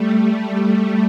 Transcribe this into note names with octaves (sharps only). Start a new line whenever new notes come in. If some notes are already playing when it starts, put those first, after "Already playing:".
Already playing: G3 A3